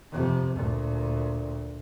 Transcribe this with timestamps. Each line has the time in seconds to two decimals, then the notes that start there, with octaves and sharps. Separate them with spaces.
0.12 F2 C3
0.56 D2 A#2